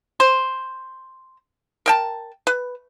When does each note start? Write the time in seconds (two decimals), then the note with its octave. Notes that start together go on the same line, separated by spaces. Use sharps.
0.20 C5
1.86 A#4 G5 A5
2.47 B4